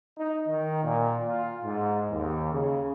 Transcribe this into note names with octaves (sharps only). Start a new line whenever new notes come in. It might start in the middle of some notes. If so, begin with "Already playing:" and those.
D#4
D#3
A#2
F4
G#2
D#2
C#3